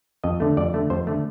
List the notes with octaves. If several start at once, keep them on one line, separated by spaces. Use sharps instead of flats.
F2 D#5
D3 A3
F2 D5
D3 A3
F2 C5
D3 A3